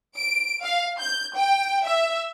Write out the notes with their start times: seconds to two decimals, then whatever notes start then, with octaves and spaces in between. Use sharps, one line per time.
0.17 D7
0.63 F5
0.98 G6
1.36 G5
1.87 E5